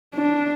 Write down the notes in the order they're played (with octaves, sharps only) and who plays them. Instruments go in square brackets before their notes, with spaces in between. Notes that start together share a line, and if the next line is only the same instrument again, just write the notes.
[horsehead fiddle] D4